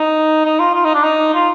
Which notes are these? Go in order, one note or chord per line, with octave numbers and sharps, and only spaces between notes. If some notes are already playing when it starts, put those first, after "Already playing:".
Already playing: D#4
D#4
F4
F4
D#4
D4
D#4
F4